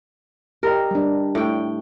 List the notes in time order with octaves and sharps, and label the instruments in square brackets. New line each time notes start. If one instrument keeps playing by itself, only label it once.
[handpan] G4 D#5 [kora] A#4
[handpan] G3 D4
[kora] A2 G5